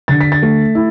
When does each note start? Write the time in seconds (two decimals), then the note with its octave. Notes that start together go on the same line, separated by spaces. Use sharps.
0.08 D3 A6
0.21 B6
0.32 A6
0.42 A3
0.75 E4